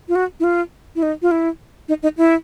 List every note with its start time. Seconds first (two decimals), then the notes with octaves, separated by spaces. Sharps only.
0.09 F4
0.15 F#4
0.40 E4
0.44 F4
0.96 E4
1.03 D#4
1.22 F4
1.31 E4
1.88 D#4
2.03 D#4
2.17 E4